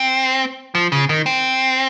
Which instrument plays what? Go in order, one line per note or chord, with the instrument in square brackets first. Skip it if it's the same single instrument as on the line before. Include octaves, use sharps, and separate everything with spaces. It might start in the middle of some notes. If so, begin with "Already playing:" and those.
Already playing: [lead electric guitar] C4
F3
C#3
D#3
C4